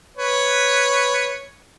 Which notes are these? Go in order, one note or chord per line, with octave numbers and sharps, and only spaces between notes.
B4 C#5